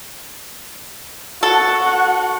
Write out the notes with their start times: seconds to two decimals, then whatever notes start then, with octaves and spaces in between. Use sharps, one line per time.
1.43 F#4 A4 F#5